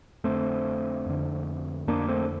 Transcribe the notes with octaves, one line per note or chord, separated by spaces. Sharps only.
F2 D3 A3 C4
F2 D3
F2 D3 A#3 D4
A3 C4